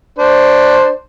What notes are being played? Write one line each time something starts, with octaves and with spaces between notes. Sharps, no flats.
D4 C5